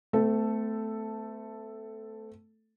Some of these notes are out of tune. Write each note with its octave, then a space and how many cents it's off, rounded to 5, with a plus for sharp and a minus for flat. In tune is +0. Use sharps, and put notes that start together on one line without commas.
A3 +0 C4 -45 A4 +0